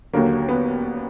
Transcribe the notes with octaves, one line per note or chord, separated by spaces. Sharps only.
D#2 D3 F#3 A#3
B3